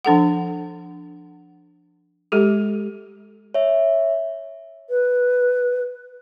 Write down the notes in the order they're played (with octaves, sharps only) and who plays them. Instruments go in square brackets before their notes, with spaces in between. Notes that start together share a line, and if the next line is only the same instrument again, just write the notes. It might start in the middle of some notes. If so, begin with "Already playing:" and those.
[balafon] F3 D4 A4 F#5
G#3 G4 A4
[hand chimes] C#5 E5
[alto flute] B4